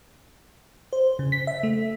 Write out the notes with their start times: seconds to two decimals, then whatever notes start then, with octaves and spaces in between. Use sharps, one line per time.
0.93 C5
1.19 C#3
1.32 B6
1.47 E5
1.63 A3